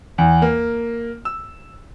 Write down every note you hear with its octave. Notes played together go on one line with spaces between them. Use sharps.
E2
A#3
E6